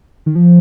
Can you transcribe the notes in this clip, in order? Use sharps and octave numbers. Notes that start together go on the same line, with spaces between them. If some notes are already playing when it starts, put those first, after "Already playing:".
D#3
F3